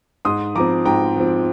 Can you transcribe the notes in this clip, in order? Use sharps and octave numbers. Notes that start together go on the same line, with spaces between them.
G#2 C6 D#6
F3 C4 A#5 D6
G#2 G5 A#5
F3 C4